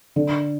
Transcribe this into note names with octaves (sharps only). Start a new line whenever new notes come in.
D3